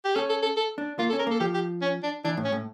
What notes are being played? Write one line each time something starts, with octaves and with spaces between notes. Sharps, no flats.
G4
C#4 A4
A4
A4
A4
D4
A#3 F4
A4
C#4
A#4
A#3 A4
F3 G4
G4
C#4
D4
E3 D4
A2
C#4
A2